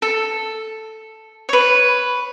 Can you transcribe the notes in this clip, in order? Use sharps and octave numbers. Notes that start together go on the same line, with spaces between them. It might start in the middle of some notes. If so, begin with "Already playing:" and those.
A4
B4 C#5